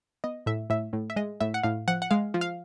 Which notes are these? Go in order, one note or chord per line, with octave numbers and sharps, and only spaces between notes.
B3 D#5
A2 E5
A2 E5
A2
E5
G#3 D#5
A2 E5
F#5
A2 F5
F3 F#5
F#5
G#3 F5
F3
F5